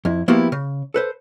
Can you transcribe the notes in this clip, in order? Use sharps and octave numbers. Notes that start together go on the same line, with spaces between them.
F2 E4
F3 A#3 B3 E4 F#4 G4
C#3
A4 B4 C5